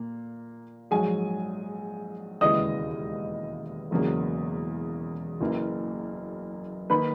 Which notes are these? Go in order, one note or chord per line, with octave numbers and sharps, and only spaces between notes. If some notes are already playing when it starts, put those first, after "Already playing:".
Already playing: A#2 A#3
A#1 G#2 F#3 G#4 G#5
E1 D#2 C#3 E3 G#3 D#5 D#6
E1 E2 C#3 F#3 A#3
F#1 F#2 E3 A#3
D#3 A#3 B4 B5